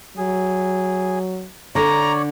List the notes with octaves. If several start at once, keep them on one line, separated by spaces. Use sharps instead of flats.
F#3 G#4
D3 C#5 D5 A#5